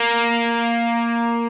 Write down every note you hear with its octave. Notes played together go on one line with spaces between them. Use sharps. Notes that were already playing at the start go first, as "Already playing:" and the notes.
Already playing: A#3